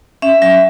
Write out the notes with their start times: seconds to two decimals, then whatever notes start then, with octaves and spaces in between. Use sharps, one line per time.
0.22 C#4 E5
0.42 F#3 E5